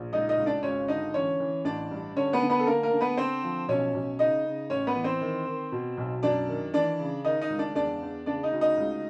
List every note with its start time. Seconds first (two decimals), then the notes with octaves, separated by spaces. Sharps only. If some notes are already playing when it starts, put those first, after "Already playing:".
Already playing: A#1
0.13 C#2 D#4 D#5
0.29 D#4 D#5
0.37 C#2
0.46 D4 D5
0.63 G#1 C#4 C#5
0.88 D3 D#4 D#5
1.14 E3 C#4 C#5
1.40 E3
1.65 A1 D4 D5
1.91 G2
2.16 D3 C#4 C#5
2.33 B3 B4
2.42 D3
2.50 B3 B4
2.60 A4
2.67 D3 A#3 A#4
2.83 A#3 A#4
2.93 D3
3.01 B3 B4
3.17 D3 C4 C5
3.43 F3
3.69 B1 C#4 C#5
3.94 B1
4.19 C#3 D#4 D#5
4.45 C#3
4.70 A1 C#4 C#5
4.87 B3 B4
4.95 E3
5.04 C4 C5
5.21 D#3
5.47 D#3
5.72 B2
5.98 B1
6.23 F#2 D4 D5
6.49 D#3
6.74 E3 D4 D5
6.99 C#3
7.24 D#3 D#4 D#5
7.41 D#4 D#5
7.50 C#2
7.59 D4 D5
7.75 E2 D4 D5
8.02 E2
8.26 C#3 D4 D5
8.43 D#4 D#5
8.52 D2
8.61 D#4 D#5
8.78 C#2